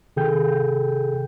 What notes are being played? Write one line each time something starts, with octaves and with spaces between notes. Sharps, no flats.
C3 D#3 G#4 A4 G5 G6